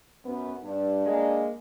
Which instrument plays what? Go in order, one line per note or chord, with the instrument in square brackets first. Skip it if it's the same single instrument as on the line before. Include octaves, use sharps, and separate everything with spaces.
[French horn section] F#2 B3
[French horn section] G2 [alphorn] D4
[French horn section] G#3 A#3